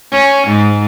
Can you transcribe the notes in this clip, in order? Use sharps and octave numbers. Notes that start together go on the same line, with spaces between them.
C#4
G#2